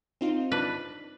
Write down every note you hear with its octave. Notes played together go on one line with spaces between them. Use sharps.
C4 D#4 F4
D4 B4